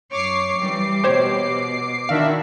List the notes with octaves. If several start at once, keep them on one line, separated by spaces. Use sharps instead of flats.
F#2 C#5 D6 C7
E3 G3
B2 G4 C5 C#5
D#3 D4 E4 F#4 E5 F5